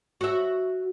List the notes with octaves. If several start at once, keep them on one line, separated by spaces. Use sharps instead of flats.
F#4 E5